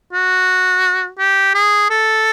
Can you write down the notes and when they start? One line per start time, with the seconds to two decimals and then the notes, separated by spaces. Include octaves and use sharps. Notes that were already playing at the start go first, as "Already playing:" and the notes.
0.13 F#4
1.19 G4
1.54 G#4
1.90 A4